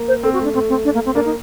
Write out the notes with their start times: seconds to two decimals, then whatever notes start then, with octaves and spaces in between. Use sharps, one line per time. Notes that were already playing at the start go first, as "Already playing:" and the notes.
Already playing: A#3
0.08 C5
0.23 C4 A4
0.33 F#4
0.39 A3 D4
0.54 A3 C4
0.69 C4
0.85 D4
0.94 A#3
1.05 C4
1.15 A#3 D4
1.25 D#4